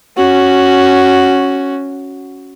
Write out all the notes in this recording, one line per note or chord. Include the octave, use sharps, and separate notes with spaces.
C#4 F#4